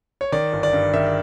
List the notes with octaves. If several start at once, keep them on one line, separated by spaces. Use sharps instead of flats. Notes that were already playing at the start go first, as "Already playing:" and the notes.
C#5
D#3 D5
G1
D5
G2
D#3 E5